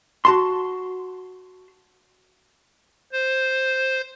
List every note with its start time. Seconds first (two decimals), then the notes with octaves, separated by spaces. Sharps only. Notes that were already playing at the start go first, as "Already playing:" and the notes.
0.25 F#4 A5 C6
3.12 C5